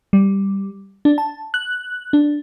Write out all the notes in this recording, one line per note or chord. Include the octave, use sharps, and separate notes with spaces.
G3
D4
A5
F#6
D4